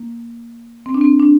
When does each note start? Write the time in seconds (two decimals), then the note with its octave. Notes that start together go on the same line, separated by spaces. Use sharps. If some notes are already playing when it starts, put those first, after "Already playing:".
Already playing: A#3
0.86 C4
0.94 D4
1.01 C4
1.19 D4